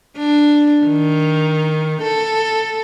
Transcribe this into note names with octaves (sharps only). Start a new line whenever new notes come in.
D4
D#3
A4